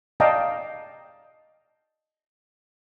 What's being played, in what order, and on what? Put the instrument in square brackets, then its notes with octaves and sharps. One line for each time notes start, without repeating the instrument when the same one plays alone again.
[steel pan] D5 D#5 F5 G5 A5 A#5